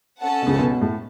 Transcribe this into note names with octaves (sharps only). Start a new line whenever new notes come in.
C#4 A4 F#5 A5
B2
C#2 C#3
B1 B2
B2
A2